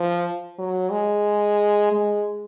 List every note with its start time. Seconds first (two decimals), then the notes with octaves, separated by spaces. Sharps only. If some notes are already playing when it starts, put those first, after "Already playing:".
Already playing: F3
0.59 F#3
0.91 G#3
1.92 G#3